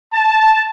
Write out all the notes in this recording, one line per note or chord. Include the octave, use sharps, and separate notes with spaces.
A5